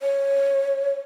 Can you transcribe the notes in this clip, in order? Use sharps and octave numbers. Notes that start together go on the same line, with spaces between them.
C#5